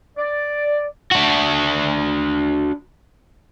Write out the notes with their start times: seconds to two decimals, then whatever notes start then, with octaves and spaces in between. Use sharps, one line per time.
0.17 D5
1.12 D4 F#4